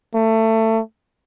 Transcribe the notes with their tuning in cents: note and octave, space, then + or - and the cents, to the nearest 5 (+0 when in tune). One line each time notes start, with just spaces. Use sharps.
A3 +20